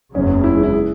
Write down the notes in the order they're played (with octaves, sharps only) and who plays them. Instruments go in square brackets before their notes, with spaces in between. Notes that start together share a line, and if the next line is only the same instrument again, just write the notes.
[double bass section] F#1 E2 C#3 F#3 [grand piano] C#4
[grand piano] E4
G#3
E4
G#4